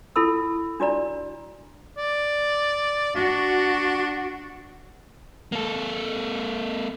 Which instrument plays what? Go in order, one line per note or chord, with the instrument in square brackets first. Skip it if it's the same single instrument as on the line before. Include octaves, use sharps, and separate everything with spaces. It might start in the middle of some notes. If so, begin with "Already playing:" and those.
[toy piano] E4 A4 B5 E6
D4 F#4 D5 A#5
[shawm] D5
[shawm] D4 [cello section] F#4
[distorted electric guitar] A#3 A4